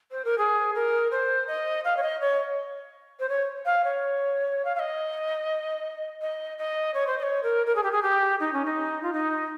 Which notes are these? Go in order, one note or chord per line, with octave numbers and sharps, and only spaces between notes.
C5
A#4
G#4
A#4
C5
D#5
F5
C#5
D#5
C#5
C5
C#5
F5
C#5
F5
F5
D#5
D#5
D#5
C#5
C5
D#5
C#5
A#4
A#4
G#4
G4
G#4
G4
D#4
C#4
D#4
F4
D#4